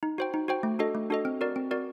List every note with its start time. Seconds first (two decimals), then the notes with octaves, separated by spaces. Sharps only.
0.03 D#4
0.18 F#4 C5 G5
0.34 D#4
0.48 F#4 C5 G5
0.63 A3
0.79 D4 F#4 A4 D#5
0.95 A3
1.10 D4 F#4 A4 D#5
1.25 C4
1.41 F#4 A#4 D5
1.56 C4
1.71 F#4 A#4 D5